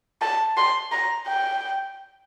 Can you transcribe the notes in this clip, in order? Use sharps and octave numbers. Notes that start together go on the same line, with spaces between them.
A5
C6
A#5
G5